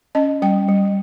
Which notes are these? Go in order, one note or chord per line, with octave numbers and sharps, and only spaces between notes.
C#4 D#5
G3 G5
G3